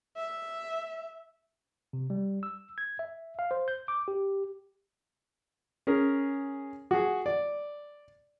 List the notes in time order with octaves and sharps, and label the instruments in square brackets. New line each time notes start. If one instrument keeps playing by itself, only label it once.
[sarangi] E5
[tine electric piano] C3
G3
E6
G#6
E5
F5
C5
G6
D6
G4
[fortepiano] C#4 G#4 A#4
F#4 G#4
D5